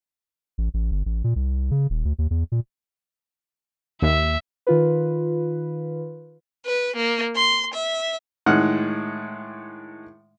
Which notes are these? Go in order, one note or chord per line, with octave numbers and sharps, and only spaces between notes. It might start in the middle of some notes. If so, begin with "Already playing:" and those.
A1
A1
G1
A1
A#2
C2
C#3
D#1
D2
D#2
E2
A#2
D#2 E5
D#3 F4 B4
B4
A#3
C6
E5
A2 D#3 G#3 F#5 F6